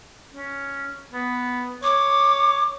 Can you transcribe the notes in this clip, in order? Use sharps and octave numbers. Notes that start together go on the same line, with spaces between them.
C#4
B3
C#5 D6